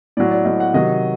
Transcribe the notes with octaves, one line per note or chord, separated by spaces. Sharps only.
A2 F#3 D5
D5
A2 F#3 D#5
F#5
C3 D#3 F#3 D#5